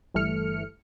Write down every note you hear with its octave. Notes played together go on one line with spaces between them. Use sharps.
G1 E3 G3 A3 F6 C#7